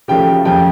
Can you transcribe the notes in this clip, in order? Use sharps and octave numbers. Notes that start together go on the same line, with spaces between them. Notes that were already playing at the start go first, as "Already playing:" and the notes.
C#3 F3 A3 G4 G5
F2 C#3 F3 G4 G5